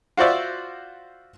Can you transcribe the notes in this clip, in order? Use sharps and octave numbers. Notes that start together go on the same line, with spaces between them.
F4 F#4 C5 D5 E5